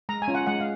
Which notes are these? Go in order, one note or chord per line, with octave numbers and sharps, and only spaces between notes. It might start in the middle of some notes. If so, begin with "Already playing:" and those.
G#3 A#5
G#5
C#4 F4
F#5
G#3 F#5
F5